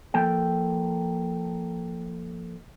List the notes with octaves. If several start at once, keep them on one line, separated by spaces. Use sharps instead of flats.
F3 A#3 A4 G5